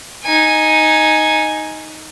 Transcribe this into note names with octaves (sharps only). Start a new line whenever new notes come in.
D#4 G#5